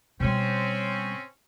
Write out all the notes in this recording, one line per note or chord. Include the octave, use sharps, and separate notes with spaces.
B2 G3 C4 C#4